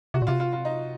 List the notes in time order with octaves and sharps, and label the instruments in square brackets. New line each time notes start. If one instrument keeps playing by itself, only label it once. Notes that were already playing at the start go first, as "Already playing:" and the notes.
[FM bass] C3 [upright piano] F#4
[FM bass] A#2
[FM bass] C3 [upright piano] F4
[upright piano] F4
F4
D#4